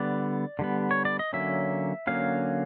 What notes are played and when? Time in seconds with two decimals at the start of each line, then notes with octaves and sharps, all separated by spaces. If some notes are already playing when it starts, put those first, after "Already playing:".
Already playing: D3 G3 B3 D5
0.59 D3 G3 B3
0.91 C#5
1.05 D5
1.19 D#5
1.33 D3 F#3 A#3 C#4 E5
2.07 D3 F#3 A#3 C#4 F5